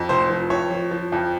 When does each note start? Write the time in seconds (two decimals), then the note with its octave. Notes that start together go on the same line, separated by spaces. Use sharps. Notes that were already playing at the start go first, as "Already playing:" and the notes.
Already playing: F2
0.09 F1 C5
0.30 F3
0.50 F2 C#5
0.71 F3
0.91 F3
1.12 F2